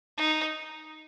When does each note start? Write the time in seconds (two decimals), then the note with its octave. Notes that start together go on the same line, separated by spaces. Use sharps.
0.17 D#4